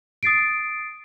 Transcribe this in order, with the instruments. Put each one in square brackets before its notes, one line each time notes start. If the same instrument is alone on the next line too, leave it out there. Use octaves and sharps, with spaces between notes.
[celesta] D#6 A6 C7 D7